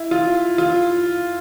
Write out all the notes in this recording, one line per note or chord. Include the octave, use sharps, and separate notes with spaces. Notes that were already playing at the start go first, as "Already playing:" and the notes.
Already playing: E4
F4
F4